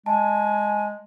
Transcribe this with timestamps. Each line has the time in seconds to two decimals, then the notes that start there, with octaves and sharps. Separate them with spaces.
0.06 G#3 G#5 A5